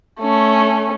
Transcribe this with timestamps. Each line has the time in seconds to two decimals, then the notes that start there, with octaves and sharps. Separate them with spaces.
0.21 A3 C#4